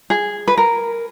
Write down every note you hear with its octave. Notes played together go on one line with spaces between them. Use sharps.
G#4
B4
A#4